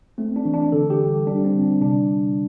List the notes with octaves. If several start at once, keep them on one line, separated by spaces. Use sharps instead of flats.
A3 C4
D4
E3
D4
D3 A4
G4
G3
G3 D4
C4
D3
D4
C3 D4
C3